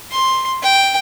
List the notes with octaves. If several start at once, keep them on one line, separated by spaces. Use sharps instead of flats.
C6
G5